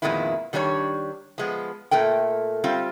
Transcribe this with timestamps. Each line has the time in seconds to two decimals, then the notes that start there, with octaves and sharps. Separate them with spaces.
0.02 F2 A#2 D#3 G#3 B3 E4
0.53 D#3 G3 D4 G4 C#5
1.38 F3 G#3 B3
1.91 A#2 A3 A#4 G5
2.64 G3 C4 F4